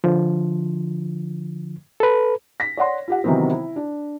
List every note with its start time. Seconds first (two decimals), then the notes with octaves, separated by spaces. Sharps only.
0.04 D3 F3
2.00 A4 B4
2.60 A#6 B6
2.77 C#5 D5 F#5 C6
3.08 F4 G4 F#5
3.24 C3 D#3 E3 F#3 B3 C4
3.50 E4
3.76 D4